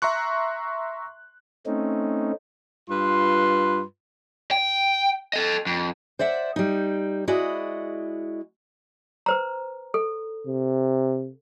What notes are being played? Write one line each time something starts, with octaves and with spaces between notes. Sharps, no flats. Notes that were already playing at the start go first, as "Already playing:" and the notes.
E5 A#5 C6 C#6 F#6
A3 C4 C#4 D#4
G2 F4 B4 C6
G5
A4 D#5
F2
C5 D5 E5 F#5
G3 D#4
G#3 E4 F#4 D5 D#5
B4 C5 A#5
A4
C3